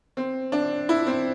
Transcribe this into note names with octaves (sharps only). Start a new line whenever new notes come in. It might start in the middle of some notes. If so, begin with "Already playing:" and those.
C4
D4
E4
C4